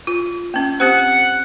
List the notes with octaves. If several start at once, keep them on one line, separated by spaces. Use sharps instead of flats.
F4
A#3 C#4
C4 G4 C5 F#5